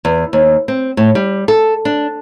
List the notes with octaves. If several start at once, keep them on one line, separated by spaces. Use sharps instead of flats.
E2
D#2
C4
A2
G3
A4
D4